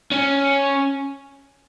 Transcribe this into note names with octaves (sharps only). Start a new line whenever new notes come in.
C#4